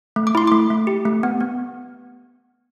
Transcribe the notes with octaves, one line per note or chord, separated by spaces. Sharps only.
A3
D6
E4 C6
A3 D6
A3
G4
A3
B3
B3